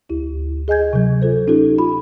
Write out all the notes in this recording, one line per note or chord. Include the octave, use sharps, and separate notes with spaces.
D2 E4 G4
G#4 D#5 G#5 G6 G#6
C3 F#3
F4 A4 C5
C#4 D#4 F4 G4 A4
F4 B5